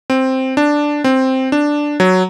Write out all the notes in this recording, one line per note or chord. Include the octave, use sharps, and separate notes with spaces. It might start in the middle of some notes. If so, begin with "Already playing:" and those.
C4
D4
C4
D4
F#3